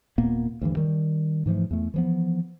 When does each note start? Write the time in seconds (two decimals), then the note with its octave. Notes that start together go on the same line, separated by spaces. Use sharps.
0.18 D#1 A#2 A#3 B3
0.61 D2 G2 E3
0.77 D#3 G3
1.46 G#2 E3 F3 A3
1.71 E2 A3
1.94 E3 F3 B3